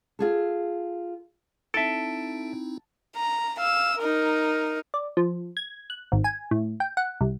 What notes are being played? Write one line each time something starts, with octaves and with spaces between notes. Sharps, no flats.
F4 G#4 A4
C4 D#4 E4 A4 E5 A5 D7
A#5
F5 E6
D#4 A#4
D5
F3
G#6
F#6
G#1
G#5
A2
G5
F#5
C2